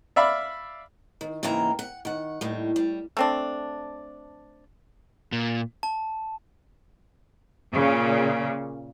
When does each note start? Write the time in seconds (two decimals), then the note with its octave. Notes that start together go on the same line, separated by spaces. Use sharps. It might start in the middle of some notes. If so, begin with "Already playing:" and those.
0.16 D5 E5 F5 B5
1.21 D#3
1.43 G#2 C#3 E3 A#3 G5 A#5
1.79 F#5
2.05 D#3 F#5
2.41 D#2 A2 G3
2.76 G3
3.17 A3 C4 D4
5.32 A#2
5.83 A5
7.71 A#2 C#3